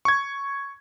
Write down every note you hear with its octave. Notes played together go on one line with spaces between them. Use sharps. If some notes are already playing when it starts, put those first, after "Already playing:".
C#6 G#6